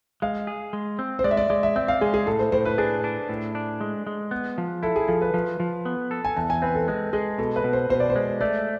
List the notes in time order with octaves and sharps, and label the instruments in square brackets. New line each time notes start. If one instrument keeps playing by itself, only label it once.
[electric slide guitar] G#3 [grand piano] F5
[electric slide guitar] G#4
G#3
C4
[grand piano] C5
[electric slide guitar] G#3 [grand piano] D5
[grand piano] E5
D5
[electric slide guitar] G#3 [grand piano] D5
[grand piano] E5
[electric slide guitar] C4 [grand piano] E5
[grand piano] F5
[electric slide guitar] G#3 [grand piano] G#4
[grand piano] G#4
[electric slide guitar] A2 [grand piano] A4
[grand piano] C5
[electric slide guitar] A2 [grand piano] C5
[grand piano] B4
[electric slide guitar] D4 [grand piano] G#4
[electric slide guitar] D4
A2
D4
G#3
G#3
B3
F3
[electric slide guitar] E4 [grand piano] A4
[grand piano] G#4
[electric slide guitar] F3 [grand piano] A4
[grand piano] B4
[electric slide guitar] F3
F3
B3
A4
[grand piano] G#5
[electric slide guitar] E2 [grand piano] A5
[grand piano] G#5
[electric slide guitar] C4 [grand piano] B4
[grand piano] A4
[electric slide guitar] G#3 [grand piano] A4
[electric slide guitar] G#3 [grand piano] G#4
[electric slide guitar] B2 [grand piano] A4
[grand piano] B4
[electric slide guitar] B2
[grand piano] C5
[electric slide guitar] B2 [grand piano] C5
[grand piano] D5
C5
[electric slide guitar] G#3
[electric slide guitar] A3 [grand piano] D5